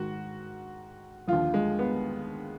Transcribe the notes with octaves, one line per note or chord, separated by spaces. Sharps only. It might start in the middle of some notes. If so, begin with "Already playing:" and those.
Already playing: G#2 D#3 F#4
D#2 D3 F3 F4
G#3
B3